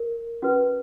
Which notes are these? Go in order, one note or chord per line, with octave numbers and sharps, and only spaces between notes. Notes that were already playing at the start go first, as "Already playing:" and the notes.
Already playing: A#4
C#4 F#4 B4